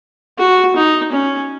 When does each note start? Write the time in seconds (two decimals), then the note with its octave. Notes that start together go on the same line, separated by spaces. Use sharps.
0.38 F#4
0.76 D#4
1.12 C#4